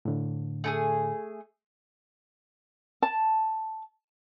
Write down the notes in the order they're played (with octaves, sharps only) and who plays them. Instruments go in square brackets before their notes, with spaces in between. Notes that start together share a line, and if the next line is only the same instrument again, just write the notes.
[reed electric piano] A2 D3
[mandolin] A3 D4 G#4
[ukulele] A5